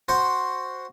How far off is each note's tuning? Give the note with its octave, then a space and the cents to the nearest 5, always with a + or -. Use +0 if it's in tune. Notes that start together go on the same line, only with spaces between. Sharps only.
F#4 +0 C5 +0 F#5 +0